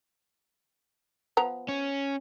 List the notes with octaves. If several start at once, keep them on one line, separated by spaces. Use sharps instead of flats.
F3 B3 A#5
C#4